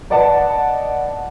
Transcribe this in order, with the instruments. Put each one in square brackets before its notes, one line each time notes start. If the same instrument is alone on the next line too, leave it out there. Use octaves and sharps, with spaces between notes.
[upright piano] B4 D5 D#5 F#5 A5